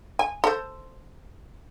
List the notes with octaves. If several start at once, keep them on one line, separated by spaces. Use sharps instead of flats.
G#5
A4 C5